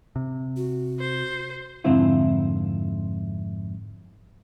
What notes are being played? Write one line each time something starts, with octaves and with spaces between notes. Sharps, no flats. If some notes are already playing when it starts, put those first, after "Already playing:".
C3
F#4
C5
F2 G#2 D3 C4 E4 F4